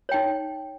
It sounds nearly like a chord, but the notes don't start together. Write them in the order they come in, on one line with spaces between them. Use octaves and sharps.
C#5 G5 D#4